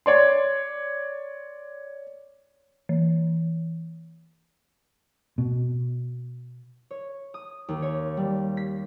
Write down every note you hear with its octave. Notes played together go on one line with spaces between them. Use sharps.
C#5 D5 C6
E3
B2
C#5
D#6
D#2
C#5
G3
B6